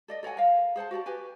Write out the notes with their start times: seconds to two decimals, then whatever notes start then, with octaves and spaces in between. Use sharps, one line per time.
0.08 A4 D5 D#5
0.23 A4 C#5 F#5 G#5
0.37 A#4 F5
0.76 G#4 C5 F#5 A5
0.91 F#4 G4 D5 A5
1.06 F#4 G4 B4 G#5